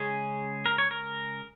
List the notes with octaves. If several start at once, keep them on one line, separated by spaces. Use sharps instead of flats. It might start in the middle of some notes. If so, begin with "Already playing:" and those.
Already playing: C#3 G#3 C#4 G#4
A#4
C#5
A#4